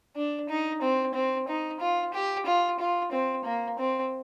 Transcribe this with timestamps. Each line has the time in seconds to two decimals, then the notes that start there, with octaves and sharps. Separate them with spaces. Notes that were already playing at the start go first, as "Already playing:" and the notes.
0.16 D4
0.49 D#4
0.82 C4
1.14 C4
1.48 D#4
1.81 F4
2.14 G4
2.46 F4
2.79 F4
3.12 C4
3.45 A#3
3.79 C4